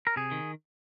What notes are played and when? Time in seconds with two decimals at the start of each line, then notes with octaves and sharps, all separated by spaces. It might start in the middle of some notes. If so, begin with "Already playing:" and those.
0.07 A#4
0.16 C3 G#4
0.31 D#3